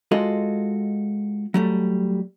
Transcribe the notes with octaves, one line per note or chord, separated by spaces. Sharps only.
G#3 F4 F#4 A4 D#5
F#3 G3 A3